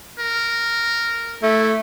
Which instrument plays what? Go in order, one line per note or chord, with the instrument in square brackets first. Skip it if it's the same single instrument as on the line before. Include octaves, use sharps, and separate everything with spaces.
[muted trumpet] A#4
[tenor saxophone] A3 [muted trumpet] E4